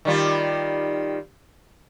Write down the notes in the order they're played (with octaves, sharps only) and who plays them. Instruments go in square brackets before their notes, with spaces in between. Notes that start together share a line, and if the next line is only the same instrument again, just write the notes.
[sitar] D#3 G3 F4